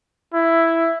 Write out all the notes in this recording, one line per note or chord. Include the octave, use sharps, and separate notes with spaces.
E4